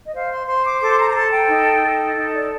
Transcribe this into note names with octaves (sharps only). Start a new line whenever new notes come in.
D#5
C5 F5
C6
C5 C6
D6
A4 D6
C6
A#5
A#5
A4 A5
G5
D#4
A4
D#4
D5